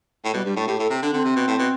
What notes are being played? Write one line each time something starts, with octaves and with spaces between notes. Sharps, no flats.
A2
B2 G3
G2 G3
A2 A3
A2 G4
A2 A4
C3
D3 D4
D3 C4
C3
B2
A2
B2